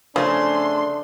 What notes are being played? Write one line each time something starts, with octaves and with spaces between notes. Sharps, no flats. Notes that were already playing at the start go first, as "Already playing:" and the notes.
C#3 F3 A3 D4 G#4 C6